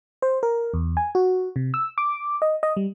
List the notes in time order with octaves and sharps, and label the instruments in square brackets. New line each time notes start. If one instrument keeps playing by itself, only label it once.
[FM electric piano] C5
A#4
E2
G#5
F#4
C3
E6
D6
D#5
D#5
G3